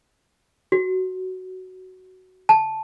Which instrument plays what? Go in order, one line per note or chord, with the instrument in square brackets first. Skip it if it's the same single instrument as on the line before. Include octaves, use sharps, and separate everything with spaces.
[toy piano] F#4
A5